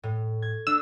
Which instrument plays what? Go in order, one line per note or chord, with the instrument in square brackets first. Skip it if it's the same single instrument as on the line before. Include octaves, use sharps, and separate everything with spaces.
[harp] A2
G#6
[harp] D4 [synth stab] E6